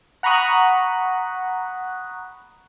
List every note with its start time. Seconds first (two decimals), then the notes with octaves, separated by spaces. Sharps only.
0.23 F#5 A#5 B5 C#6 D#6 F#6